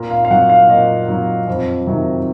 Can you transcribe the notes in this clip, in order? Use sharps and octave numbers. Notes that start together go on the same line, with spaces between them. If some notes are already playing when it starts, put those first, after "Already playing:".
Already playing: A#2 A#4
F5
F5
F#3 F#5
F5
A#2 D#5
F#3
F2
C3 D#3 F#3